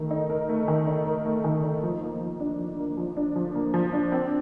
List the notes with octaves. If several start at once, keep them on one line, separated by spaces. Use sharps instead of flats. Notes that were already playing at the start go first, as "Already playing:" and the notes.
Already playing: D#3 A3 A#4
D#4
A#4
A3
D#3
D#4
A#4
A3
D#3
D#4
F3
A#3
F3
D4
F3
A#3
F3
D4
F3
A#3
F3
D4
C4